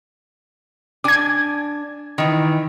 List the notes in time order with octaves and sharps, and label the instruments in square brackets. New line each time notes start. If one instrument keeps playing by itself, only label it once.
[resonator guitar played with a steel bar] D4 G#5 [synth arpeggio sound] D6 G#6
[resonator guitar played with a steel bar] D#3 E3